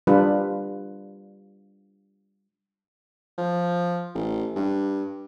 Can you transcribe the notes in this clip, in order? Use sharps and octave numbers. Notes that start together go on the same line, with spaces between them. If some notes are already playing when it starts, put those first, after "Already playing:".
G3 D4 F4 B4
F3
A1
G2